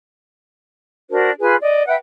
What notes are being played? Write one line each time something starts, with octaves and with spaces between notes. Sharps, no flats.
D4 F#4 A#4 C5
F4 G#4 B4 G#5
D5 D#5
B4 E5 F#5 G5